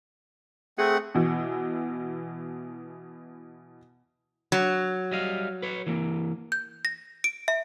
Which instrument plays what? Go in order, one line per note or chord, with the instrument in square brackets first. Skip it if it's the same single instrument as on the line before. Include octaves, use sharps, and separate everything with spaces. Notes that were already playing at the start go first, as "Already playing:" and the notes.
[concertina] A3 C4 F#5 [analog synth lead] G#4
[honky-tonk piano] B2 E3
[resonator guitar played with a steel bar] F#3
[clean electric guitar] G3 D#5 F5
B4 C#5
E3 A#3
[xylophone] G6
A#6
D7
E5